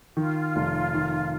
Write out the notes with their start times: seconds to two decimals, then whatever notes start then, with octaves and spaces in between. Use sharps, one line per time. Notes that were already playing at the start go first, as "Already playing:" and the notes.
0.17 D#3 F4
0.56 F1
0.94 D#3